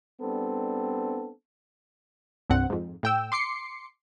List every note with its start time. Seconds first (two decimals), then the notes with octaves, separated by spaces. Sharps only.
0.21 G3 B3 C4 D4 A4
2.50 C2 G2 C4 F#5
2.70 F2 G#2
3.03 A2 G5 E6
3.32 C6 D6 C7 C#7